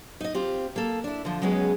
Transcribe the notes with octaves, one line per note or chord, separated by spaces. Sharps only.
D#4 D#5
C4 F4 G4
A#3 A4
D4 E4
D3 F3
F#3 G#3 B3 C#4 G#4